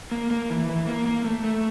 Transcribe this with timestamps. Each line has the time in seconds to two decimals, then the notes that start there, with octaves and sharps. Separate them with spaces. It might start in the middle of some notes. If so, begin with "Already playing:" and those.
0.11 A#3
0.31 A#3
0.50 E3
0.69 E3
0.87 A#3
1.07 A#3
1.25 A3
1.44 A3